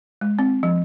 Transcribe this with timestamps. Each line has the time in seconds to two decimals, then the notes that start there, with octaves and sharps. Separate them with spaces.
0.21 G#3
0.39 C4
0.63 F3